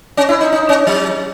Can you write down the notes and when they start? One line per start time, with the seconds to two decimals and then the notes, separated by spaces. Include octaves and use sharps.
0.17 C#4
0.29 E4
0.41 D#4
0.53 D#4
0.69 C#4
0.87 F#3